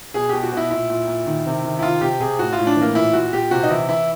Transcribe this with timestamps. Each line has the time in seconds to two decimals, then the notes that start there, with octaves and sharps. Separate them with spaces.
0.14 B2 G#4
0.29 B2 G4
0.43 F#4
0.52 B2 E4
0.71 A#2 E4
0.90 A#2
1.08 A#2
1.26 D#3
1.46 C3
1.64 D#3
1.79 E4
1.82 D#3 F4
2.01 C3 G4
2.20 C3 G#4
2.39 A2 F#4
2.53 F4
2.58 A2
2.67 D4
2.76 E3
2.82 A#3
2.95 A#2 E4
3.13 A#2 F#4
3.33 A#2 G4
3.51 C3 F#4
3.63 D#4
3.70 E3 E4
3.89 E3 E4